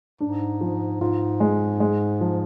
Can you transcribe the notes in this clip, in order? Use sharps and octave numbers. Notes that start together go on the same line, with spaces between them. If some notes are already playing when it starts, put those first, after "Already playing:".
G#2 D4
F3
G#2 F4
G#3
G#3
F3